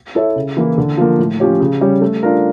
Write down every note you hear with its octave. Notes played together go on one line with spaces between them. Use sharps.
E4 A4 C#5 E5
C#3
E3 A#3 E4
D3
F3 A#3
A2
F3 C#4 G4 C#5
C#3
G3 C#4 G4 C#5
A3
D4 F4 A#4